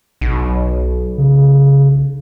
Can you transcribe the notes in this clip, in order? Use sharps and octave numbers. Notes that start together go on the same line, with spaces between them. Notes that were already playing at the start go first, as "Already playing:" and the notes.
B1
C#3